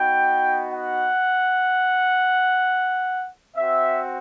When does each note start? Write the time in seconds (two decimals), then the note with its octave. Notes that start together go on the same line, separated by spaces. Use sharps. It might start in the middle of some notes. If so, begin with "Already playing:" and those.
Already playing: B3 D#4 F#4 G5
0.73 F#5
3.56 C4 F#4 E5